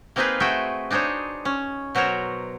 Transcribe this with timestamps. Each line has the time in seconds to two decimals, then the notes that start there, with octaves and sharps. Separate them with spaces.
0.16 A#3 C4 D#4 F4 G#4 B4
0.40 A3 F#4 G#4 E5 G5
0.91 D4 D#4 G#4 C5 C#5
1.45 C#4
1.95 B2 F#3 A#4 C5 C#5